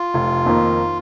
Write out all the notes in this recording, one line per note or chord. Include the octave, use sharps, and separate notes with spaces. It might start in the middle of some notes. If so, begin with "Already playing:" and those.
Already playing: F4
F1
F2 D#3 A#3